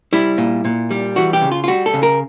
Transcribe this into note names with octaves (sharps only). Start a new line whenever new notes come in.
G3 E4
A#2
A#2
G3
E3 F#4
G4
C#3
F4
F4
G3 F#4
A4
C#3
A#4